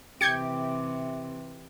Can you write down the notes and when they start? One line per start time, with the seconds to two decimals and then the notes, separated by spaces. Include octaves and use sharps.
0.21 C3 E3 G4 G6 G#6 C#7